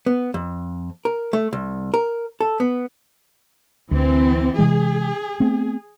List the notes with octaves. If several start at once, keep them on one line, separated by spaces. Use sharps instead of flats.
B3
F2
A#4
A3
C2
A#4
A4
B3
D2 E3 C4
C3 E3 G#3 G#4
A3 B3 C4